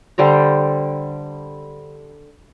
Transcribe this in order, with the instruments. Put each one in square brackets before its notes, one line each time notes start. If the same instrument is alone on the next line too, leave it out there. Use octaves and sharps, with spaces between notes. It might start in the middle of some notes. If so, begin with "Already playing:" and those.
[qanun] D3 G3 C5 A#5